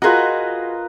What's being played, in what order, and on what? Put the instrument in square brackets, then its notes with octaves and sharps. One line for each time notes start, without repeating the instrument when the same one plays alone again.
[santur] F4 A#4 A#5 [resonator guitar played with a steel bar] F#4 G#4 [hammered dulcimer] B4 D#5